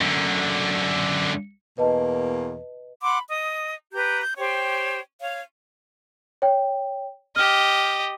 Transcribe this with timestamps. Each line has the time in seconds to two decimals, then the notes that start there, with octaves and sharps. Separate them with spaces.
0.01 F#2 D3
1.78 E2 B2 A#3 B4 D#5 A5
3.01 F#5 B5 C6 D6
3.29 D#5 D#6
3.93 G4 B4 A#5 G6
4.21 G6
4.38 G4 C5 C#5 G5
5.20 C#5 F5
6.42 C#5 G5
7.36 G4 D#5 F6